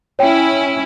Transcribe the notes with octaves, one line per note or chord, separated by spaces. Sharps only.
C#4 E4 C#5 G5